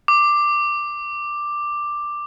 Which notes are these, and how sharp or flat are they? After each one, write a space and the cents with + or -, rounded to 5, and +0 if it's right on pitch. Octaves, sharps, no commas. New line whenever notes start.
D6 +10